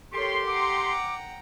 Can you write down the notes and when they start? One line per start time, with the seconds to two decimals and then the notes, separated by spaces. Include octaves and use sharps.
0.14 G4 A4 A#4 C#5 C6
0.47 F#5 G5 A#5 D6